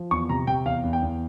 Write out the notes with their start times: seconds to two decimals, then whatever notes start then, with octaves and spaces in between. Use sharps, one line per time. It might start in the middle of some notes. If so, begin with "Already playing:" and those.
Already playing: F3
0.11 E2 C#6
0.29 C3 A#5
0.47 C3 G5
0.65 E2 F5
0.84 E2
0.93 G5
1.02 E2